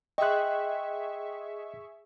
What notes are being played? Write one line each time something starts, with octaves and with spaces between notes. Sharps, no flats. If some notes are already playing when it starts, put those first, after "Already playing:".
G#4 D#5 E5 G5 C6 C#6 F#6